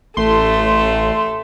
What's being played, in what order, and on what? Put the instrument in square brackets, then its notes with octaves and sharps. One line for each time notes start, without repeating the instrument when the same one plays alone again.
[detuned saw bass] A1 [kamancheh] A3 A4 [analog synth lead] C6